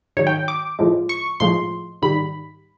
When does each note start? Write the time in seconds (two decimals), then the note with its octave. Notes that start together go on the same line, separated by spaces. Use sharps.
0.17 G#2 D#3 F#3 C#5
0.27 G5
0.48 D6
0.79 A2 F3 G#3
1.09 C#6
1.40 A2 F3 G#3 C6
2.02 G#2 D#3 G3 B5